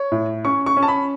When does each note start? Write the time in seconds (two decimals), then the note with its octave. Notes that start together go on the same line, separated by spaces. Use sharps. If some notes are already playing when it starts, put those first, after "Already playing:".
Already playing: C#5
0.12 A2
0.44 C#4 C#6
0.66 C#6
0.77 C#4
0.83 A5
0.88 B5